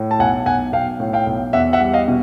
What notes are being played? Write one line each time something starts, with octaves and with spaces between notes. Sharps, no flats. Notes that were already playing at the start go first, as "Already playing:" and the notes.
Already playing: A2
A5
B1 F#5 G#5
B1 F#5 G#5
B1 F5 G5
A2
F5 G5
B1
E2 E5 F#5
E5 F#5
G3
D#5 F5
B2